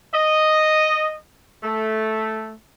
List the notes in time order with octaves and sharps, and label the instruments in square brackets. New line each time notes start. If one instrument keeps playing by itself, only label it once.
[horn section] D#5
A3